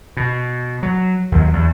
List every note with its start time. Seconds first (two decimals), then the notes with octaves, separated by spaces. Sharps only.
0.17 B2
0.83 F#3
1.32 D#2 F#3
1.53 E2